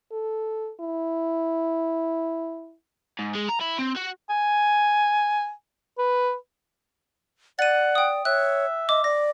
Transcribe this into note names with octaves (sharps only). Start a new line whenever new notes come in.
A4
E4
G#2
G#3
A#5
E4
C4
F#4
G#5
B4
D5 F#5 A6 D#7
G5 D#6
C#5 E5 F#6
D#5 D6
D5 A#6